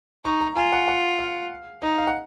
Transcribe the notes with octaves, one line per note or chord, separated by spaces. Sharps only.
D#4 C#6
A#5
F4 G#5
F#5
F#5
F5
D#4 D#5
F5
F#5